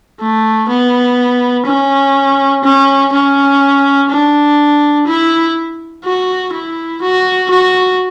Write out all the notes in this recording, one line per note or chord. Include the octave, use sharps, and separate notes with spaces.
A3
B3
C#4
C#4
C#4
D4
E4
F#4
E4
F#4
F#4